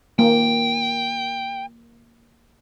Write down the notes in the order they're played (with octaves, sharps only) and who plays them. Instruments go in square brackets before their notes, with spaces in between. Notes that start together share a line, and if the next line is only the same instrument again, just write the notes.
[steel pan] A#3 [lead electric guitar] G5